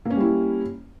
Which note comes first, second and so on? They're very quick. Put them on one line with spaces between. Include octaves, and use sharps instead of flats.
A#3 C#4 G3 E4